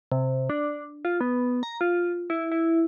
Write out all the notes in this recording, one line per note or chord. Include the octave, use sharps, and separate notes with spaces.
C3
D4
F4
B3
A#5
F4
E4
E4